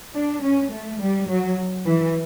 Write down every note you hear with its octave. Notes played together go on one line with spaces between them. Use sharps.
D4
C#4
A3
G3
F#3
E3